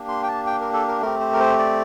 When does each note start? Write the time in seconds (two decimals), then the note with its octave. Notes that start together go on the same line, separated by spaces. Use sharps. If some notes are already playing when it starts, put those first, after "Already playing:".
Already playing: A#3 D4 G4
0.08 C6
0.23 G5
0.28 A5
0.47 G5
0.61 A#4
0.73 A4
0.88 A#4
1.01 A3 C4 G4 A#4
1.20 C5
1.33 A#4
1.40 C5
1.59 D5